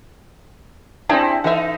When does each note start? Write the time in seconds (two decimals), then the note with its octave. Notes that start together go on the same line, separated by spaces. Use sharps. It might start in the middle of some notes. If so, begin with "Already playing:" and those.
1.09 C4 D4 E4 G4 G#4
1.44 E3 D#4 A4 E5 F#5